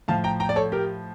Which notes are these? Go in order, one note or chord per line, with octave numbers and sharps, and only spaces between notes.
A2 F3 F5 A5
G5 A#5
G5 A#5
D5
A4 C#5
G4 A#4